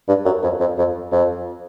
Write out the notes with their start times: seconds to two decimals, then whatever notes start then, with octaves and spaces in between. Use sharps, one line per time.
0.08 G2
0.25 F#2
0.43 F2
0.60 F2
0.78 F2
1.12 F2